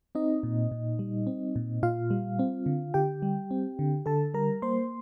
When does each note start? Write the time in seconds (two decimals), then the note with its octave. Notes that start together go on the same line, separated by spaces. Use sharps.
0.15 C4 D#4 D#5
0.43 A#2
0.71 A#2
0.99 G3
1.27 C4
1.56 A#2
1.83 A#2 F4 F5
2.11 G3
2.39 C4
2.66 D3
2.94 D3 G4 G5
3.22 G3
3.51 C4
3.79 D3
4.06 D3 A4 A5
4.34 G3 A#4 A#5
4.62 A#3 C5 C6